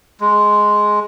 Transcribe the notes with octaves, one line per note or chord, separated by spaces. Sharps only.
G#3